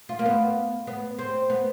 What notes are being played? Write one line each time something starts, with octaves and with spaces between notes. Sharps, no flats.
F4
A#3
B3
B3
C4
B3